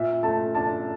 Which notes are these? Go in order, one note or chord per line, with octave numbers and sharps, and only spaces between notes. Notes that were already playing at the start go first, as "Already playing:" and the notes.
Already playing: A#2 E5
A3 A5
D4 A5